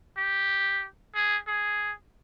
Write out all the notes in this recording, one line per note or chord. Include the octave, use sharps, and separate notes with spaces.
G4
G#4
G#4